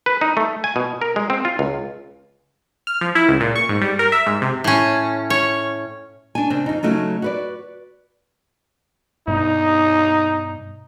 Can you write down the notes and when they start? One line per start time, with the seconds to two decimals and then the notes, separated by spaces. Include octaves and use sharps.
0.06 B4
0.21 D#4
0.37 A3
0.64 G#5
0.76 B2
1.02 A#4
1.16 G#3
1.30 C4
1.45 F4
1.59 C#2
2.87 F6
3.01 F3
3.15 E4
3.28 C#2
3.40 A#2
3.56 C#6
3.69 G#2
3.81 G3
3.99 A#4
4.12 E5
4.26 G#2
4.42 C3
4.64 A2 C#4
5.30 C#5
6.35 D4 G#5
6.50 C#3 C4 D4
6.66 F2 D#4
6.83 C#3 F#3 A3 C#4 D#4
7.22 F#4 B4 D5
9.28 G2 B2 D#4